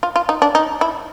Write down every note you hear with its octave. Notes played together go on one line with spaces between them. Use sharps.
F4
F4
D#4
D4
D#4
E4